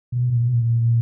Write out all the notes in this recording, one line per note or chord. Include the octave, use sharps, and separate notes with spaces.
B2
A#2
B2
A#2